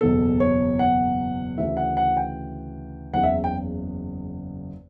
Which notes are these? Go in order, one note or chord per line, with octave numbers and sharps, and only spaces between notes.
F#1 E2 B2 A4
C#5
F#5
D2 C#3 E3 E5
F#5
F#5
G5
F#1 E2 C#3 F#5
E5
G5